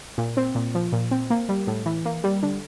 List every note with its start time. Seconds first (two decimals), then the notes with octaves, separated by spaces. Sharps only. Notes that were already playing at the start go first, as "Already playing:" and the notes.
0.18 A#2
0.37 C4
0.55 A#2
0.75 F3
0.92 A#2
1.11 C4
1.30 A#3
1.49 G3
1.67 A2
1.86 E3
2.05 A#3
2.24 G3
2.43 D3